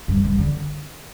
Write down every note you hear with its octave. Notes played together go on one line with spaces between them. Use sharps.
G2
G2
D3